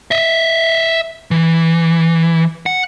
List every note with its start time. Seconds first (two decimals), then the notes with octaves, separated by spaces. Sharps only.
0.11 D#5 E5
1.31 E3
2.66 F#5